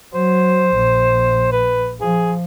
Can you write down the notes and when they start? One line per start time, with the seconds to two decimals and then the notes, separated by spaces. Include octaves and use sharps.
0.14 F#3 C5
0.75 A#1
1.52 B4
2.01 F3 G#4